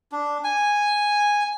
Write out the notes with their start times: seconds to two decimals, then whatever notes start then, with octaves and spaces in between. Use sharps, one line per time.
0.12 D4
0.44 G#5